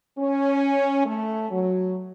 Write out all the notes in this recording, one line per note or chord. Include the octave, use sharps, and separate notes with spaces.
C#4
A3
F#3